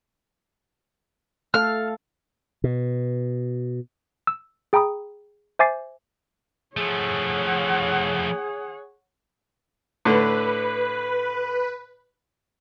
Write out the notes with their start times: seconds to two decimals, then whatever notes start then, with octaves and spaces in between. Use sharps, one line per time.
1.54 A3 A4 F5 F6
2.64 B2
4.27 E6
4.73 G#4 G5 A#5 B5 D#6
5.59 C5 E5 G#5 D6 A6 C7
6.77 F3 A3 G#4 C#5 F#5
10.05 A2 D3 B4